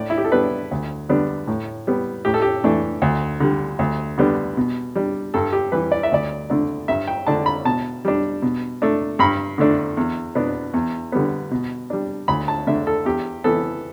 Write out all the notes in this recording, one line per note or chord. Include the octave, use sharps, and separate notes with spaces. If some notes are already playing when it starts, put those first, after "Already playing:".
Already playing: A2 D5
E4
G4
A4
G3 B3 D4 B4
D2
D3 G3 B3 D4
A2
G3 B3
A2 G4
A4
G4
E3 A3 D4
D2
D3 G3
D2
D3 G3 B3 D4
B2
G3 D4
G2 A4
G4
E3 G3 B4
D5
E5
D2 D5
D3 A3 D4
G2 E5
G5
D3 A3 D4 A5
B5
B2 A5
G3 D4
B2
A3 D4
G2 B5
D3 A3 D4
E2
B2 B3 D4
E2
D3 G3 B3
B2
G3 D4
D2 B5
A5
D3 A3 D4 E5
A4
E2 G4
E3 B3 A4